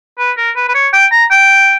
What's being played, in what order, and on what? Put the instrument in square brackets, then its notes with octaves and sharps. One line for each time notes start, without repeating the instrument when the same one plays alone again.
[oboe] B4
A#4
B4
B4
C#5
G5
A#5
G5